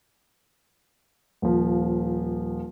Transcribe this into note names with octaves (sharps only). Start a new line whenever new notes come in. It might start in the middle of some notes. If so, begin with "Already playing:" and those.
D#1 F3